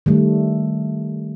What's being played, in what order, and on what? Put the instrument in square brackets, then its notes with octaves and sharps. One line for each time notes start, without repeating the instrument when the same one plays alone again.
[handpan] D#3 G3 A3